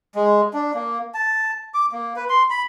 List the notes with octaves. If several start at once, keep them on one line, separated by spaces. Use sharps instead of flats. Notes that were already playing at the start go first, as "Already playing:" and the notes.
G#3
D4
A#3
A5
D6
A#3
B4
C6
B5